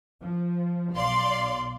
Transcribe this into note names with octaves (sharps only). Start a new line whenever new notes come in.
F3
B1 D5 F5 C6